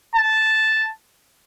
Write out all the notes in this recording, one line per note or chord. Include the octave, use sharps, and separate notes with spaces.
A5